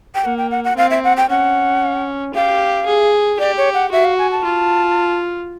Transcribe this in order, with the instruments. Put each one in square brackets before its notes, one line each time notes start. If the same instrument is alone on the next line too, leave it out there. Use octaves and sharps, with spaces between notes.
[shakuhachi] G5
[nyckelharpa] A#3 [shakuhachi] F#5
[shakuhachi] G5
F#5
F#5
[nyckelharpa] C4 [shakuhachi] F5
[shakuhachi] E5
F#5
G5
[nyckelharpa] C#4 [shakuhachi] F#5
[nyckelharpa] G4 [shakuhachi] F5
[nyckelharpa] G#4
[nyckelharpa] G4 [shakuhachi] D5
[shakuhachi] C#5
F#5
[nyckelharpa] F#4 [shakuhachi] E5
[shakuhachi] F5
G#5
A5
[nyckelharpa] F4